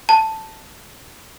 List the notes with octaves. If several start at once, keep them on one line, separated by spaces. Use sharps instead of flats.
A5